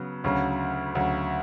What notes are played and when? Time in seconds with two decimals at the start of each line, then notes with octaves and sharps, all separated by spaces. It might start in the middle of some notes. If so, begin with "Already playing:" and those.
Already playing: C#3 F#3 B3
0.24 D2 C#3 F#3
0.95 D2 C#3 F#3